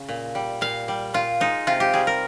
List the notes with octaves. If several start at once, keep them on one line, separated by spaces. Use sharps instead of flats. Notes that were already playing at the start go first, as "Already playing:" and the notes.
Already playing: C#3
A#2
G3
A#2 F5
G3
A#2 F4
G#3 D#4
C3 F4
G4
G3 G#4
A#4